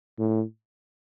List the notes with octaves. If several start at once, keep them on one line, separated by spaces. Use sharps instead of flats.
A2